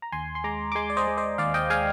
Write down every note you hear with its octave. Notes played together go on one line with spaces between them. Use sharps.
A#5
D#2 G#5 C6
C6
G#3 A#5 D6
D6
G#3 G#5 C6
D5
C5 D#5
G#3
C5 D#5
D#2 D5 F5
D#5 G5
G#3 F5 G#5